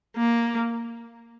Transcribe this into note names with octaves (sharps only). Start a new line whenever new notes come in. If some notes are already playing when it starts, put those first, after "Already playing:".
A#3